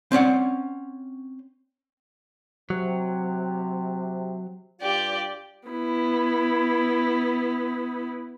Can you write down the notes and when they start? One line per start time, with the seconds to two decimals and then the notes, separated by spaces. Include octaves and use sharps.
0.12 C4 C#4 D5 F#5
2.70 C3 F#3
4.81 G2 F4 G4 D5
5.68 B3 E4